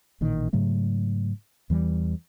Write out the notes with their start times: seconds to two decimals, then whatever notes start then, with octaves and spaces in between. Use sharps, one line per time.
0.21 A1 A#2 D#3
0.53 G#2 C#3 F#3 A3
1.70 E2 E3 G3